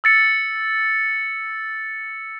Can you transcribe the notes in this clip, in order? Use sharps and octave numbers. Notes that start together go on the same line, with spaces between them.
E6 A6 C#7